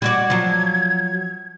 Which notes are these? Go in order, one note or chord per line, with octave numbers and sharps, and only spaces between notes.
G3 F#4 D5 G#6
F3 F#3